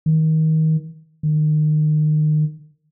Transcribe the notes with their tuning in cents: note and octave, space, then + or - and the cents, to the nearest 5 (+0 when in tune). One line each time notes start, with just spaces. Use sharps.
D#3 +25
D#3 -30